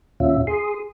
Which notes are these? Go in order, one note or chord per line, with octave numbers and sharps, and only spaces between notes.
D#2 A#2 C#4 F4 E5
G#4 C6 D#6